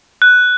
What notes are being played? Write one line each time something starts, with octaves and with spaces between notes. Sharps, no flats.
F#6